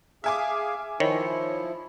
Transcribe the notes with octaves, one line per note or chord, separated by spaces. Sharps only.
G#4 E5 F5 G#5 D6
D#3 F3 E4 C#5